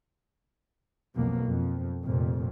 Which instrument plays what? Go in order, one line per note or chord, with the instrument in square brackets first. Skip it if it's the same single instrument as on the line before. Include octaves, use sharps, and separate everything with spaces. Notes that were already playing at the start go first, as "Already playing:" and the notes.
[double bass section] B1 F2 B2 A#3
F2
F1 F2 A#2